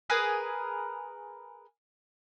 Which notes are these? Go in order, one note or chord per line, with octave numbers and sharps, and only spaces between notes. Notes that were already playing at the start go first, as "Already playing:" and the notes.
G#4 A#4 B4 G#5